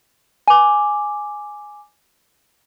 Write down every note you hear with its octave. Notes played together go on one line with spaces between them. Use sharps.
G#5 D6